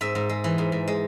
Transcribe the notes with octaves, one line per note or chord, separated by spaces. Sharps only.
G#2 E5
G#2
G#3
E3
G#2
G#2
G#3